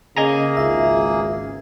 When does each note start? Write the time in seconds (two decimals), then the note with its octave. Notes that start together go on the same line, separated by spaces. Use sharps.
0.17 C#3 A#3 G#4 D#5 G#5 A#5
0.57 G#1 C#2 E5